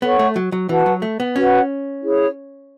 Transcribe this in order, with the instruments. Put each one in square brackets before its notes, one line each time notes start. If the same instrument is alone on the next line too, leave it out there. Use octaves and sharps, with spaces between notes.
[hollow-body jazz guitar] B3 [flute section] A4 C#5 F#5 C#6
[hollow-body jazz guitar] A3
F#3
F#3
[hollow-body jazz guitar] E3 [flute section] F#4 B4 F#5 A5
[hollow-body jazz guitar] F#3
A3
B3
[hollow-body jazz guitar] C#4 [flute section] F#4 B4 F#5
[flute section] E4 G#4 C#5